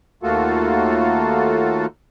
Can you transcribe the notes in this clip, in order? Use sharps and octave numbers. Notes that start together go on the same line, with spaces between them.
D#2 A3 A#3 F4 F#4 A4